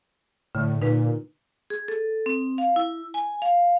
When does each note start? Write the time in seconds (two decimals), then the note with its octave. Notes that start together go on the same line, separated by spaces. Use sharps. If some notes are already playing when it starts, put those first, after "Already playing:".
0.55 A2 D3
0.82 A#2 D#4 B4
1.70 G#4
1.88 A4
2.26 C4
2.58 F5
2.76 E4
3.14 G#5
3.42 F5